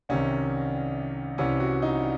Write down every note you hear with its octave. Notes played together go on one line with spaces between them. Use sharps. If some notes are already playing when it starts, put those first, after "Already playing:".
C2 C3 D#3 C#4
C2 C3 E3 C#4
F#4
D#4